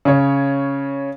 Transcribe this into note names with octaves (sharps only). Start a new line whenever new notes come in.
C#3 C#5